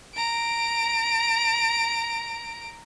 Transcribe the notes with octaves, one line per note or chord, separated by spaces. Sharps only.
A#5 D7